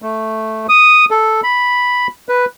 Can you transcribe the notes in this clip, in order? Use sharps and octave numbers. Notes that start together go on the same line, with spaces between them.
A3
D#6
A4
B5
B4